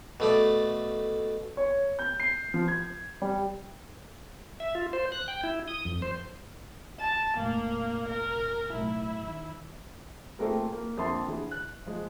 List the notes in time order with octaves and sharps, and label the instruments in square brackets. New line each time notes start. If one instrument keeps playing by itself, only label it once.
[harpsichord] B2 A3 D5
[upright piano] C#5
G6
C7
F3
G#6
G3
[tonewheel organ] E5
F4
C5
F#6
G5
E4
D#6
F2
C5
[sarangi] A5
[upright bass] F1 A#2 [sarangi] A#3
[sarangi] A#4
[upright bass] B1 A2 [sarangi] E4
[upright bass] D3 D#3
[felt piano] A3 A#3 C4 F4 G#4 A#4
A#3
F2 D3 A#3 E5 A5 C6
D3 E3 G#4
F#6
F3 G#3